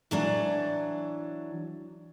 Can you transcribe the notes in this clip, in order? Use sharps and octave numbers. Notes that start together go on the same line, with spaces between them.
E3 F#3 D4